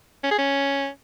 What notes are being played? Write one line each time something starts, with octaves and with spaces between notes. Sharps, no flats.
C#4
G#4
C#4